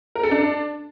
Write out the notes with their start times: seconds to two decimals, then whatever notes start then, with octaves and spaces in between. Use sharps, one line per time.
0.15 A#4
0.23 A4
0.31 D4